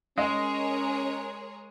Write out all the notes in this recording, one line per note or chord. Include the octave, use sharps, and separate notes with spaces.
G#3 C#4 G#4 A#4 C#5 D#5